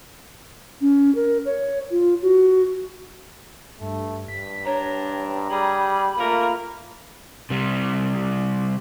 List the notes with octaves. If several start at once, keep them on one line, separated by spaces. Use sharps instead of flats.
C#4
A#4
C#5
F4
F#4
G2 A3
G2 B6
D4 C#5 A#5
G3 G#4 B5
A3 A#3 F4 A#4
C3 G3